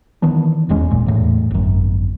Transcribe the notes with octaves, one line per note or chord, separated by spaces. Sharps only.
D#3 E3 B3 D4
D#1 E2 G#3 C#4
F#1 A#2
E2 A2
G#1 F#2